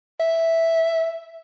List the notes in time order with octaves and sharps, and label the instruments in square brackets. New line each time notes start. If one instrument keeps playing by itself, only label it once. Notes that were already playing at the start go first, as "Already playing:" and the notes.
[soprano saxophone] E5